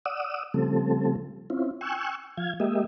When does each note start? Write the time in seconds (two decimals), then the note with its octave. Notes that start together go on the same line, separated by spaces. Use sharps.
0.06 D5 F#5 D#6 E6
0.54 C#3 F3 G3 A3 C4 A4
1.50 C4 C#4 E4 F4
1.81 G5 G#5 C#6 E6 F#6
2.37 F3 F5 G#6
2.60 G#3 A#3 G4 D#5 E5